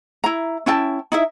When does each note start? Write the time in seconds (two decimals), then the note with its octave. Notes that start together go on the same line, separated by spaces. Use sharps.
0.24 E4 A#5
0.66 C#4 E4 G5 A5
1.12 D#4 E4 E5